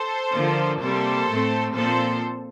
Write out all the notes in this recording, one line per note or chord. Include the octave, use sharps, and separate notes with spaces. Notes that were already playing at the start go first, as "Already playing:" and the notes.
Already playing: A4 C5
D3 F3 A#3
C3 G3 A#3 A4 C5
A2 A3 C4
A#2 F3 C4 A4 C5